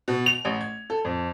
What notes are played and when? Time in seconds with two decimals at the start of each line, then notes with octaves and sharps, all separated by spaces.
0.08 B2
0.26 F7
0.45 A1
0.61 G#6
0.90 A4
1.05 F2